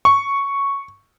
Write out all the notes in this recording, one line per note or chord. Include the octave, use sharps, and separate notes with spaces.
C#6